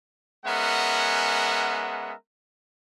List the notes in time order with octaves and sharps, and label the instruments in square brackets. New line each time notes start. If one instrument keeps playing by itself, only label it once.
[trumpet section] G#3 B3 C#4 A#4 E5 F#5